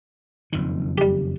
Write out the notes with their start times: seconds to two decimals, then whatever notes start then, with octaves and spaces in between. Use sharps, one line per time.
0.53 F#1 F2 D#3
0.98 G3 G4